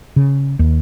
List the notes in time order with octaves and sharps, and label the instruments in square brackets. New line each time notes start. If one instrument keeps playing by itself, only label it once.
[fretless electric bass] C#3
D#2